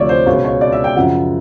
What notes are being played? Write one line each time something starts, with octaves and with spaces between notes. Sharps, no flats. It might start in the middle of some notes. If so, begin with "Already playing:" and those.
Already playing: D2 C3 F3 C#5 D5 E5
C5
C#2 B2 C#5
C#5
D5
E5
G5
F#2 C#3 F3 F#5